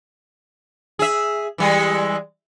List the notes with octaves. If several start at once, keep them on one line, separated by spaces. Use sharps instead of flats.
G#4 E5
E3 G3 G#3